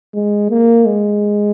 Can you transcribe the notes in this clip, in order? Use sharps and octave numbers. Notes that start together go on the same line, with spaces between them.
G#3
A#3
G#3